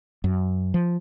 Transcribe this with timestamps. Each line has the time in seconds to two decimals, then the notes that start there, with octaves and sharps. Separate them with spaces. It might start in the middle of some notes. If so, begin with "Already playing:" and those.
0.24 F#2
0.74 F3